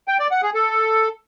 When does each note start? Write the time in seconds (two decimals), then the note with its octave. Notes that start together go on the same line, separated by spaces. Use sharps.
0.08 G5
0.20 D5
0.31 F#5
0.43 G#4
0.54 A4